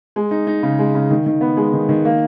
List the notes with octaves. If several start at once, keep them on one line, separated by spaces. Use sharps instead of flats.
G#3
D#4
D#4
C#3
G#3
C#3
D#3
D#3
B3
G#3
D#3
D#3
A#3